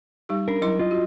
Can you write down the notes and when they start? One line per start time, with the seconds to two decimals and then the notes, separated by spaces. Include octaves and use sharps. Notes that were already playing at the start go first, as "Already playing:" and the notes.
0.29 G3 D#4 G4
0.48 C#4 D4 A#4
0.62 F#3 E4 C6
0.79 F4 D#5
0.91 F#4